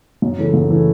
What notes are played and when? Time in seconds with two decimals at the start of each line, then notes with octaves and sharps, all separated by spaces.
0.22 F#2
0.39 C#3 E3 A3
0.54 F#2
0.70 C#3 E3 A3